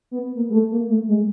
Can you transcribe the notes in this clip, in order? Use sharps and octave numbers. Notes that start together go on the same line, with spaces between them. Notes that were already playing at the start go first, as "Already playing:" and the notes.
B3
A#3
G#3
A3
A#3
A3
G#3